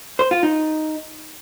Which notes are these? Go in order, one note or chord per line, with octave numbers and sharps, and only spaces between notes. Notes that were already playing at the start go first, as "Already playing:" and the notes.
C5
F4
D#4